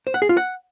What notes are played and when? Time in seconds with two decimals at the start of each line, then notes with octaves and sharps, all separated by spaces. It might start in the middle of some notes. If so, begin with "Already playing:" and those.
0.07 C5
0.14 F#5
0.22 G#4
0.29 F4
0.37 F#5